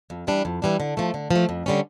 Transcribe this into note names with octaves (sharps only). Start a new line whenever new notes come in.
F2
E3 G3 D4
F2
E3 G3 D4
D3
F3 A3
D3
F3 A3
F2
D3 G3 C#4